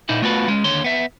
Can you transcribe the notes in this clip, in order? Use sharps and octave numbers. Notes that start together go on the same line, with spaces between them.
A#2 A#3 D#4 E4
A3 B3 F4 F#4 B4
G#3 C#4
D#2 D3 C#5 C6
B3 E5